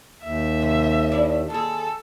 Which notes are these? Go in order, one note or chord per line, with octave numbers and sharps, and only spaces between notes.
D#2 E5
C3
D4 E4
D#2 G#4 A4